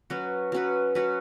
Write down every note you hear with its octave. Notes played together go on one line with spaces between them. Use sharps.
F#3 C#4 F#4 B4
F#3 C#4 F#4 B4
F#3 C#4 F#4 B4